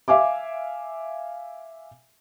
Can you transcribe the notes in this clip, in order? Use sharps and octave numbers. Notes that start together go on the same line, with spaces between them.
E5 F5 G#5 D6